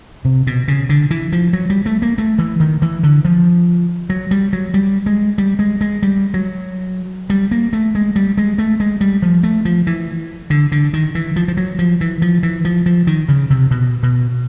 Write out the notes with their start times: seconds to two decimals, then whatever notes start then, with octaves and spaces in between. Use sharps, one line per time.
0.25 C3
0.47 B2
0.68 C#3
0.89 D3
1.11 E3
1.32 F3
1.53 F#3
1.70 G3
1.86 A3
2.02 A#3
2.18 A3
2.39 E3
2.60 D#3
2.82 E3
3.03 D3
3.25 F3
4.10 F#3
4.31 G3
4.53 F#3
4.74 G3
5.06 G#3
5.38 G3
5.59 G#3
5.81 G#3
6.03 G3
6.34 F#3
7.30 G3
7.51 A#3
7.73 A3
7.95 G#3
8.16 G3
8.37 G#3
8.58 A3
8.80 G#3
9.01 G3
9.22 F3
9.43 A3
9.65 F3
9.87 E3
10.50 D3
10.72 D3
10.93 D#3
11.15 E3
11.36 F3
11.48 F3
11.57 F#3
11.79 F3
12.01 E3
12.22 F3
12.43 E3
12.65 F3
12.86 F3
13.07 D#3
13.28 C#3
13.50 C3
13.71 B2
14.03 B2